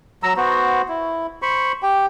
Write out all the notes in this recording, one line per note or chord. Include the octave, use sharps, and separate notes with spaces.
F#3 A#5 E6
B3 F#4 C5
E4
C5 B5 C#6
G4 G5